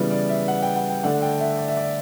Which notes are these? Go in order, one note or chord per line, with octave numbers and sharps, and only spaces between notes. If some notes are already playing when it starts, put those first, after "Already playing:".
Already playing: C#3 E3 G3 B3
D5
E5
F#5
G5
F#5
G5
D3 A3 D4 F#5
G5
E5
D5
E5
D5